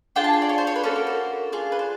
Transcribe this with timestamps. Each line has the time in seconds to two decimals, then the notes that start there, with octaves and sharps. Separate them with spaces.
0.16 D4 F4 G#4 G5
0.24 A5
0.33 G#5
0.42 D5
0.49 C#5
0.58 C5
0.67 C#5
0.76 B4
0.83 A#3 C#4 F#4 A4
0.96 A#4
1.07 C5
1.52 D4 F4 G#4
1.72 B4
1.79 C5